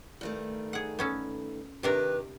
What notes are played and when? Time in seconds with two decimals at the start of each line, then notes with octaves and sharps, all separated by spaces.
0.21 G2 D#3 A3
0.73 G#4 F#5
0.99 B3 C#4 A4
1.83 C3 D#3 D4 G4 A#4 B4